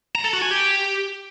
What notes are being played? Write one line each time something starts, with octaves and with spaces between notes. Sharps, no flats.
A#5
A4
F#4
G#5
G4